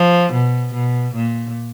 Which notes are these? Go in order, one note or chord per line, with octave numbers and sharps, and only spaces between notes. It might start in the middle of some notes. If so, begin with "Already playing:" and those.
Already playing: F3
B2
B2
A#2